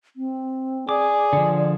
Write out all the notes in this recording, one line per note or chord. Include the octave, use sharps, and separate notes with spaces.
C4
G#4 D5 D6
D3 F3